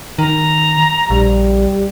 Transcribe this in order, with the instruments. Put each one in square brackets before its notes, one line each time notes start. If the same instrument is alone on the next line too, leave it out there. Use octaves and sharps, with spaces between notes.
[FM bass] D#3 [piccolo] A#5
[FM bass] A#1 [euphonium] G3